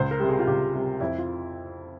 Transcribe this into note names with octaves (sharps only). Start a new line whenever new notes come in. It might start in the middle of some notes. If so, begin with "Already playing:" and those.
Already playing: C#2 C5
A#4
C3 G3
G#4
F4
C#2 G4
C3 G3
F2 E4
F4